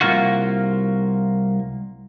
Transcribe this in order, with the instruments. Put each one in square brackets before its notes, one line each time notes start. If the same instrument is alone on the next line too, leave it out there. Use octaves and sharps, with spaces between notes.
[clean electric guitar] C2 A#3 F4 F#4